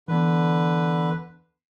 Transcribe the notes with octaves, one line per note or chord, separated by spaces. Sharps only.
D3 E3 B3 B4